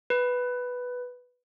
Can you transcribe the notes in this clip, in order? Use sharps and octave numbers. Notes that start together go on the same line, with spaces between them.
B4